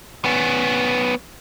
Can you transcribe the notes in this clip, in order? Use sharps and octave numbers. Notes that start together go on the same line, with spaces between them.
B3 C#4